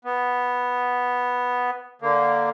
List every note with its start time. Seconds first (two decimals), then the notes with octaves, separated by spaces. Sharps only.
0.05 B3
2.02 D3 A#3